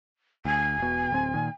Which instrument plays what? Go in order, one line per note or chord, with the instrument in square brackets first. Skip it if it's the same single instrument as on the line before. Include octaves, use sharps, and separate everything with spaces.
[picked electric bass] D2 [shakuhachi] G#5
[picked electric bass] E1 B2
D1 C4
A#2 D#3